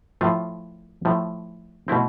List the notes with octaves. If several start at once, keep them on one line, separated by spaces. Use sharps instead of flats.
A2 F3 A3 F4
A2 F3 A3
B2 A3 C4 E4